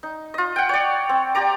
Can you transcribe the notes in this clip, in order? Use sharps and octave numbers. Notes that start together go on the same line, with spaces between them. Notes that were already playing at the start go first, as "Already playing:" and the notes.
D#4
F4 D#5
F#5 G5
C#5 D5
C4
G4 D5 A#5 D6